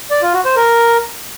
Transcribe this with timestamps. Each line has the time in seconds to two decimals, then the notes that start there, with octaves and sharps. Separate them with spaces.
0.11 D5
0.22 F4
0.34 F#4
0.45 C5
0.56 A#4